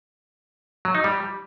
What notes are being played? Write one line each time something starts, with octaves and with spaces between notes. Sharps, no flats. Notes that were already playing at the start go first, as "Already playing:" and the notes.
F#3
D#4
G3